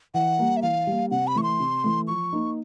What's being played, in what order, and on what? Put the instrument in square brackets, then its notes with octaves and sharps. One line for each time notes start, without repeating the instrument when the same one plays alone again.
[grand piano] E3 [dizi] F#5
[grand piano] G3 A#3
[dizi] E5
[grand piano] E3 [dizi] F5
[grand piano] G3 A#3
[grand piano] C3 [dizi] F#5
[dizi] B5
[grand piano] E3 A3 [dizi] C#6
[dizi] C6
[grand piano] C3
E3 A3
[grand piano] F3 [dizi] C#6
[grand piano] A#3 D#4